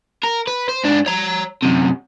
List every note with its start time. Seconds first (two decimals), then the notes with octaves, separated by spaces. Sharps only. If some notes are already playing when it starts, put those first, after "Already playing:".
0.23 A#4
0.47 B4
0.69 C5
0.84 G#2 D4
1.06 C#5 A#5
1.62 F#2 C3